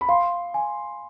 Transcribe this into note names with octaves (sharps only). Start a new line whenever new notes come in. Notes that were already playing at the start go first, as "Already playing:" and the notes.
B5
F5 C6
G#5